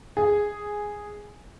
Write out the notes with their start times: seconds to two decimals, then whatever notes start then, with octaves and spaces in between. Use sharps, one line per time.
0.17 G#4